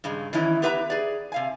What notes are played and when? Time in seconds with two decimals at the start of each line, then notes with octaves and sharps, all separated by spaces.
0.04 G2 C#3 G#3
0.33 D#3 E3 B3 C#4 E4
0.62 B3 G4 B4 E5 A5 A#5
0.90 G#4 D5
1.32 C3 F5 G#5